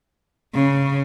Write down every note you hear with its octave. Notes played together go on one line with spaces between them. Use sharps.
C#3